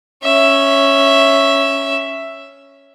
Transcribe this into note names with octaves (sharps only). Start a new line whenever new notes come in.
C#4 E5